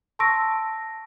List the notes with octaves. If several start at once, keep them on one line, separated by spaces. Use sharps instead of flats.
A5 C6 C#6 E6 A#6 D7